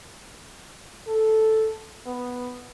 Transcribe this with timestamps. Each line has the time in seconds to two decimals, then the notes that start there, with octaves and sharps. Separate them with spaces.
1.08 A4
2.06 B3